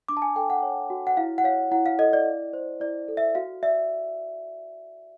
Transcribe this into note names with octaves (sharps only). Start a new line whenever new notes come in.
D4 D6
A5
G#5
A4 G5
F#5
C#5
F#4
F#5
E4 F5
F#5
C#5 F5
E4 F#5
F5
A4 D#5
D5
E4
C5
E4 D5
A4
E5
F#4 F5
D5 E5